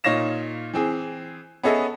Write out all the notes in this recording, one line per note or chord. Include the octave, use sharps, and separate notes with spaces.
A#2 D#4 C#5 F5 A#6 E7
E3 C4 G#4
B3 C#4 G#4 A4 D#5 E5